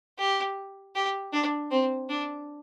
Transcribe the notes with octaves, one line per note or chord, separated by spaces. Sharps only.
G4
G4
D4
C4
D4